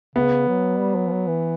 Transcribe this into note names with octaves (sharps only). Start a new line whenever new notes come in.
C#3 B3
F#3
G3
F#3
F3
F#3
E3